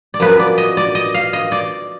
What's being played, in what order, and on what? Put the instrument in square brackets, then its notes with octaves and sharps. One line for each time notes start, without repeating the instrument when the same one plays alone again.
[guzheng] D5
F#2 F3 B3 B4
D5
D#5
D5
D#5
F5
D#5
D5